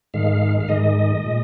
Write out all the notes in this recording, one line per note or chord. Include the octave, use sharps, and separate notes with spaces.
G#2 D#3 G#3 F5
F5
G#2 D#3 G#3 D#5
A#2 G#3